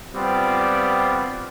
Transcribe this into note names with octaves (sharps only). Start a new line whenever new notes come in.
G3 B3 C4 F4 D5